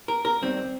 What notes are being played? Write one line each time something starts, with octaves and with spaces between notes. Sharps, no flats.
A#4
A#4
D#2 D#3 G3 C4